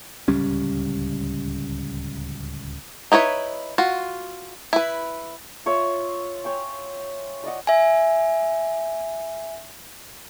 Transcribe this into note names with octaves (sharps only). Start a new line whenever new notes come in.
D1 C#2 G3 C#4
D#4 E4 B4 C#5
F4 F#4
E4 B4
F4 C#5 E5 E6
C#5 G5 G#5
D5 D#5 F#5
E5 G#5